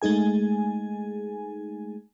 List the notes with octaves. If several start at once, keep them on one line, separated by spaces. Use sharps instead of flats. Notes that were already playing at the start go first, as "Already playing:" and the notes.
G#3 A3 D#4 G#4 G#5